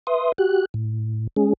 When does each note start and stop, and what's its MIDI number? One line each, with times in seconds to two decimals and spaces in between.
0.07 0.32 71
0.07 0.32 76
0.07 0.32 84
0.07 0.32 87
0.38 0.65 66
0.38 0.65 67
0.38 0.65 90
0.74 1.27 45
1.36 1.53 56
1.36 1.53 61
1.36 1.53 68